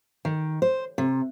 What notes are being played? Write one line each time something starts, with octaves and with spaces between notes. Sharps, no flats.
D#3
C5
C3